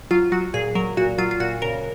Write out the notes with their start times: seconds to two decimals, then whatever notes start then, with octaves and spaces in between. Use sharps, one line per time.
0.11 F#3 F4
0.32 F#3 F#4
0.54 A#2 G#4
0.75 F#3 A#4
0.97 A#2 F#4
1.18 F#3 F4
1.31 F4
1.40 A#2 F#4
1.62 C#3 A#4